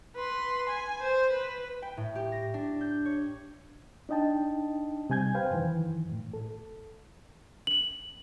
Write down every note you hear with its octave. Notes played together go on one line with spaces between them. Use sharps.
B4 C6
G#5
C5
B4
G5
A2
G4
A#6
D4
G6
C#5
D4 D#4 D#5 G5 A5
C3 G3 G#5 G6 G#6
B4 C5 F5 G5 G#5
F#2 D#3 E3
A2
A4
F#7